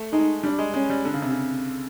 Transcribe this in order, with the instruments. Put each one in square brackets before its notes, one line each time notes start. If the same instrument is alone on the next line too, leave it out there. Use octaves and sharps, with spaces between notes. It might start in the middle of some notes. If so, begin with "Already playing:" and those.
Already playing: [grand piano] A3
[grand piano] G#3 [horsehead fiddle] D#4
[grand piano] G3 [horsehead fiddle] D4
[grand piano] G#3
[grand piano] G#3 [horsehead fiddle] C#4
[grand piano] G3
D3
C#3
C3
C#3